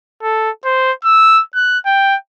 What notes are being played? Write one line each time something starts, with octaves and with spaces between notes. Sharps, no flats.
A4
C5
E6
F#6
G5